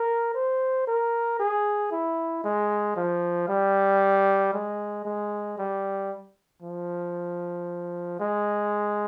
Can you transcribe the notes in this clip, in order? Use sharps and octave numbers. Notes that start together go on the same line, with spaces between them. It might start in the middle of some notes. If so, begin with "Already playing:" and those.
Already playing: A#4
C5
A#4
G#4
E4
G#3
F3
G3
G#3
G#3
G3
F3
G#3